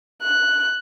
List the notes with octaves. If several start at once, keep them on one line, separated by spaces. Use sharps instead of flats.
F#6